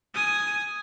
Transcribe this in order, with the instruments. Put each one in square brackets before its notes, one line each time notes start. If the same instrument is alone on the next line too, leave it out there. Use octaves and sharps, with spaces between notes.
[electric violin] G#5 D#6